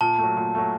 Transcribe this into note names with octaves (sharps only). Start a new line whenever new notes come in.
A#2 A5
F#3 A3
A#2
F#3 A3